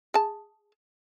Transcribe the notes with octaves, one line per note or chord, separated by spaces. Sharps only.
G#4 A5